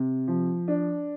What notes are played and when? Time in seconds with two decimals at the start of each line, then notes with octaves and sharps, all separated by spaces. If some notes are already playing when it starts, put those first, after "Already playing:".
Already playing: C3
0.28 F3
0.68 D4